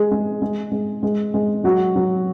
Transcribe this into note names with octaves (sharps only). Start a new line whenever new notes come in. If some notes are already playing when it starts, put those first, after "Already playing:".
Already playing: G#3 G#4
G#3
G#3
G#3
G#3
G#3
F#3 F#4
F#3